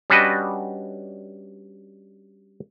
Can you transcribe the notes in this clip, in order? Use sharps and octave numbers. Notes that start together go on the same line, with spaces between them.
G3 C#4 D4 F#4 B4 D#5